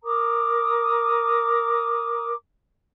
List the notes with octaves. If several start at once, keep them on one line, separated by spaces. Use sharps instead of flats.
A#4 A#5 D6 D#6